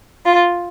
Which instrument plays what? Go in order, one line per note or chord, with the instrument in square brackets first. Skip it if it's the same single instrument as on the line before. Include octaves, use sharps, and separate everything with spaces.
[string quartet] F4